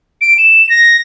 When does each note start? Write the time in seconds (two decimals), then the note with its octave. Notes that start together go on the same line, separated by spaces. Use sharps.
0.21 D7
0.38 E7
0.69 A#6